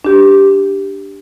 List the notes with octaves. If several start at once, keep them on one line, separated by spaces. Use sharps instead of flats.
D4 G4